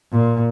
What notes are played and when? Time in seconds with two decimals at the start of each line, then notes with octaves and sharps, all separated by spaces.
0.12 A#2